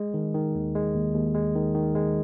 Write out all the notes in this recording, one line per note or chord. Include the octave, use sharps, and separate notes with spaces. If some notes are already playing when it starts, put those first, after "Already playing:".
Already playing: G#3
D#3
D#3
D#2
G#3
D#2
D#2
G#3
D#3
D#3
G#3